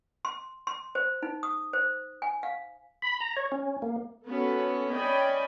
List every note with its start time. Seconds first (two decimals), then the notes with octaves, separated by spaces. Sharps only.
0.25 C6
0.67 C6
0.95 C5
1.23 D#4
1.43 D#6
1.73 C5
2.22 G#5
2.43 F5
3.02 B5
3.20 A#5
3.37 C#5
3.52 C#4
3.82 A#3
4.28 B3 C#4 F#4 A4
4.92 C#4 D5 D#5 G5 G#5 B5